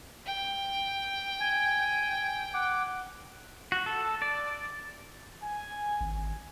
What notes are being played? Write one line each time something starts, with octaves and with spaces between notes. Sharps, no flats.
G5
G#5
F#5 D6
F#4
A4
D5
G#5
G#1